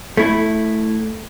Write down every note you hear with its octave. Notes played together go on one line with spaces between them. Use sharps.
A3 E4